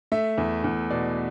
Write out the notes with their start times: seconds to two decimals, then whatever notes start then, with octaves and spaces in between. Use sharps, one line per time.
0.12 A3 E5
0.38 E2
0.64 E2
0.90 B2 D5